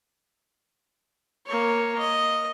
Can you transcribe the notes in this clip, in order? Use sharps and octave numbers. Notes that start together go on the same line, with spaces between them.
A#3 C#5
D#5